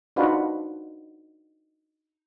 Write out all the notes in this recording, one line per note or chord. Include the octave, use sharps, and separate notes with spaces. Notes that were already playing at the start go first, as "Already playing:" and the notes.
D4 D#4 F4 F#4 B4